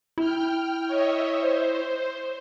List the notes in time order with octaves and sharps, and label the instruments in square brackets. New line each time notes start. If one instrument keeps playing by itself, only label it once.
[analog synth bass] E4 [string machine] G5 F6
[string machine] C#5 D#5 E5
C5